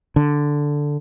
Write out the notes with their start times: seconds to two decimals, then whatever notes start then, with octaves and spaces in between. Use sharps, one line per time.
0.16 D3